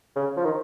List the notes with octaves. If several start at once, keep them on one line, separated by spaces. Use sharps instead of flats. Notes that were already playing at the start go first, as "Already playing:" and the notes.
C#3
F3
D#3